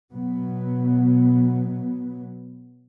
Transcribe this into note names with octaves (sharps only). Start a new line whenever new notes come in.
B2 F#3 B3